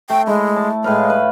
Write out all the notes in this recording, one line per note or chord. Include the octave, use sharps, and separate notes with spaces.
A3 G5
G#3 E4
A5
A2 G#3 B4 F5
B4